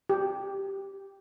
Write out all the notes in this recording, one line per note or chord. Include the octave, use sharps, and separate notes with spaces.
G4